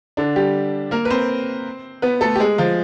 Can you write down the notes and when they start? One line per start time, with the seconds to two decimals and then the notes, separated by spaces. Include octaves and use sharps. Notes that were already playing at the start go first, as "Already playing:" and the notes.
0.17 D3 D4
0.36 G3 G4
0.91 A#3 A#4
1.05 B4
1.10 C4 C5
2.02 B3 B4
2.21 A3 A4
2.36 G4
2.40 G#3 G#4
2.58 F3 F4